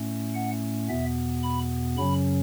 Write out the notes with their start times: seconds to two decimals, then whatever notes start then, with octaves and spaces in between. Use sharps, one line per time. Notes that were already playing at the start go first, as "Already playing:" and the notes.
Already playing: A2 A3 C#4
0.35 F#5
0.89 E2 B2 B3 E5
1.43 B5
1.97 F#2 C#3 F#3 C#4 B5